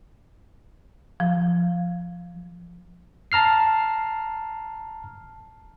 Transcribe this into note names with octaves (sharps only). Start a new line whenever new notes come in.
F3
A5 A#5 F6 C7